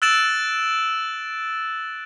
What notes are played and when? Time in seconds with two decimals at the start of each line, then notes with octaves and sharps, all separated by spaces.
0.02 E6 F#6 A6 D7 E7 F#7